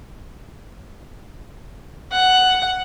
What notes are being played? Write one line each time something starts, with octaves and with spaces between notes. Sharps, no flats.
F#5